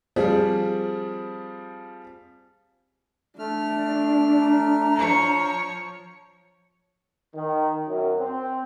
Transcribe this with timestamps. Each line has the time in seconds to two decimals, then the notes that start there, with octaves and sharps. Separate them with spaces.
0.16 F3 G3 C4 G#4
3.39 A3 D4 F6
4.40 A#5
4.95 F3 C#5
7.36 D#3
7.88 F#2
8.18 C4